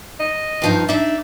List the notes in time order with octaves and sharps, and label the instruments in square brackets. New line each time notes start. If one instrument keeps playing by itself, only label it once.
[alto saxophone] D#5
[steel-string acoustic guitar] G2 F3 D#4
[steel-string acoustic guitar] D4 D#4 [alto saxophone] E5